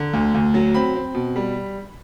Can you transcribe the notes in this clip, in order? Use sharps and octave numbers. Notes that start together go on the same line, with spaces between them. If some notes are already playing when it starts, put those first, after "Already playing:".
Already playing: D3 A#5
D2
D2
F#3
C4 B5
C4
B2
G3